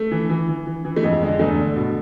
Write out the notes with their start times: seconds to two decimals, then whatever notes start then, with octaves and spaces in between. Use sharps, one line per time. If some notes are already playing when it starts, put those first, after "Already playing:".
Already playing: A3
0.11 E3
0.30 E3
0.49 E3
0.67 E3
0.85 E3
0.96 A3
1.03 F2 G#3
1.22 D3 G#3
1.39 E2 A3
1.59 D3
1.76 B2